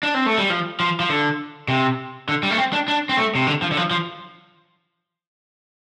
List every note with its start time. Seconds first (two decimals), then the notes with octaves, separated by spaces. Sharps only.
0.03 D4
0.14 C4
0.26 A3
0.38 G3
0.50 F3
0.80 F3
1.00 F3
1.09 D3
1.68 C3
2.29 D3
2.43 G3
2.50 A3
2.57 C4
2.73 D4
2.88 D4
3.09 C4
3.17 A3
3.35 C3
3.47 D3
3.62 F3
3.72 D3
3.77 F3
3.91 F3